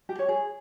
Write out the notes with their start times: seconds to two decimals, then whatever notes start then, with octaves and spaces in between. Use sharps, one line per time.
0.09 G4
0.19 C#5
0.29 G#4